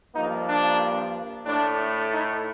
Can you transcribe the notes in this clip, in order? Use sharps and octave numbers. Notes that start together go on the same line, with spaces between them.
G2 F3 A#3 D#4
D4
A2 A3 D4
D#4